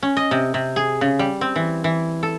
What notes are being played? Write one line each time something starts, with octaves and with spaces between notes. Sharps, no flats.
C#4
D#5
C3
C3
G#4
C#3
G3
C4
E3
E3
A4